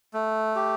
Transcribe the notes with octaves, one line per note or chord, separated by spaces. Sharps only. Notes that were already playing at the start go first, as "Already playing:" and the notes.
A3
G4